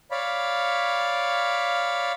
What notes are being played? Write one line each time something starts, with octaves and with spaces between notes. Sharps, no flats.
C#5 D5 F5 B5